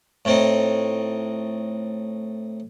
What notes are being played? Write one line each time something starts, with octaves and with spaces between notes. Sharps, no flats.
A2 C4 D#4